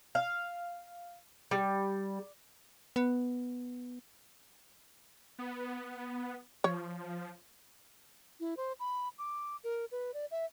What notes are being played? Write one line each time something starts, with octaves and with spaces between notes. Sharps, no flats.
F5
G3
B3
B3
F3 C#5
E4
C5
B5
D6
A#4
B4
D5
E5